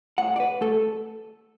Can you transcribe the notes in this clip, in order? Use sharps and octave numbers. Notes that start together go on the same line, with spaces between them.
A2 F#5
D5
B4
A3 A4